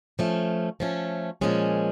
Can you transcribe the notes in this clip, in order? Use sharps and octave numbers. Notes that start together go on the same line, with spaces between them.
F3 A3 C#4
F3 A3 C#4
A#2 F3 G#3 C#4